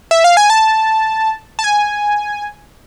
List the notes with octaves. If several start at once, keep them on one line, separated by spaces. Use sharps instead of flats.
E5
F5
G#5
A5
A5
G#5